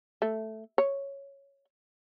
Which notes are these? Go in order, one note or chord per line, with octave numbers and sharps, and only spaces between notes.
A3
C#5